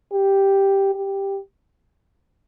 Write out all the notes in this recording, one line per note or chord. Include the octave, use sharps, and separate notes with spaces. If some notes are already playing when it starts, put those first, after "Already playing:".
G4
G4